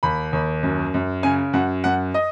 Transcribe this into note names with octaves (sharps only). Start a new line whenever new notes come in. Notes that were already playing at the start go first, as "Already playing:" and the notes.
D#2 B5
D#2
F#2
F#2
C#3 G#5
F#2 F#5
F#2 F#5
D#5